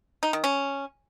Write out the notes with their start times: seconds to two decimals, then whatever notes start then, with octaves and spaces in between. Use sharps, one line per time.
0.23 D#4
0.33 D#3
0.44 C#4